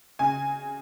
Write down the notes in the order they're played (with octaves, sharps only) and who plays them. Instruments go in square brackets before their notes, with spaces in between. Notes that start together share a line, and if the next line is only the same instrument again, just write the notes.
[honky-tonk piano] C#3 G#5